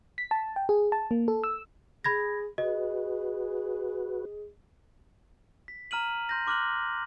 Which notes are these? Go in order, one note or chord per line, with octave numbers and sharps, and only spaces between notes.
B6
A5
G5
G#4
A5
A#3
A4
E6
G#4 B5 G#6 A#6
F#4 G#4 B4 D#5
B6
A#5 F6 D#7 F#7
C6 G6 A#6
C6 D6 F6 F#6 F#7